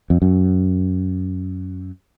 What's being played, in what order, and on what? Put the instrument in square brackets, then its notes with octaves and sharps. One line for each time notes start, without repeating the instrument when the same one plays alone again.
[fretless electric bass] F2
F#2